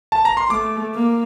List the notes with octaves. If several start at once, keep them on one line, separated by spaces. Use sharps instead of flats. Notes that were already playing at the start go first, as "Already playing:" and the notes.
A5
A#5
C6
A3 D6
A#3